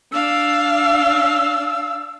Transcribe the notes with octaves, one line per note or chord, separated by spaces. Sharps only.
D4 F5 E6